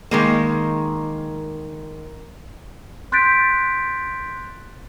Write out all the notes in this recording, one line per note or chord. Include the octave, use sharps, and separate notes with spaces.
D#3 G#3 A#3
C6 F#6 G6 A6 B6 D7